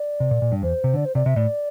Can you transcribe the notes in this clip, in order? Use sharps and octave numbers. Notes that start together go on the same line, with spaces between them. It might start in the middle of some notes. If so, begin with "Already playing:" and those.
Already playing: D5
C3
A#2
A#2
G2
E2 C5
C3
D3 D5
C5
C3 D5
C3 E5
A2 D5